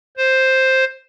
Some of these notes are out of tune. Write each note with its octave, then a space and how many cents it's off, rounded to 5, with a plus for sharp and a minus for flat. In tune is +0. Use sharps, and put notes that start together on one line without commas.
C5 +5